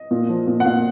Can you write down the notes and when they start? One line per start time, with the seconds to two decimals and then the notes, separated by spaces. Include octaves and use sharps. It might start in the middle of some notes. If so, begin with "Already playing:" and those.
Already playing: D#5
0.11 A#2
0.29 F3
0.47 A#2
0.60 F#5
0.65 A#2 F5